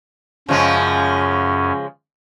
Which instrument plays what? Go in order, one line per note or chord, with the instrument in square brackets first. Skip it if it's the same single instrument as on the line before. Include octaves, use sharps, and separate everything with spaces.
[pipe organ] F#2 C#4 [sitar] C#3 F3 G#3